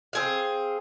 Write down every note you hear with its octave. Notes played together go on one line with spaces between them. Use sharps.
C4 G#4 F5